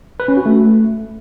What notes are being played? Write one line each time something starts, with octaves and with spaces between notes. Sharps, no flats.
B4
C#4
F#4
A3